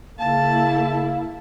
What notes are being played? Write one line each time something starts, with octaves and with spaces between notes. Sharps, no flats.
C#3 A#3 E4 F5 A5